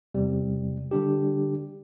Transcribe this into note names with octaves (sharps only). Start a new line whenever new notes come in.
E2 C3 G3
D3 G3 D4 G4